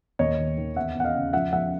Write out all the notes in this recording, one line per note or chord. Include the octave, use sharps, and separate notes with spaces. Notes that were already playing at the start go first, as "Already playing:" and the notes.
D#2 C#5 D#5
D#3
D#3
E2 E5 F#5
E2
F#5
D#5 F5
C#3
F3 E5 F#5
F3 E5 F#5